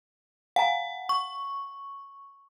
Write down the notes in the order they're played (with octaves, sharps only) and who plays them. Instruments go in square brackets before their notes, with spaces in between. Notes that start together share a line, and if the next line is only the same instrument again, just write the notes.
[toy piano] F5 G#5 A#5 [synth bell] F#5
[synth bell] C#6